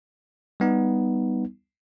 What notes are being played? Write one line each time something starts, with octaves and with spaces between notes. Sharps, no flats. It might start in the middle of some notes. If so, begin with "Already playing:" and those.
G3 B3 D#4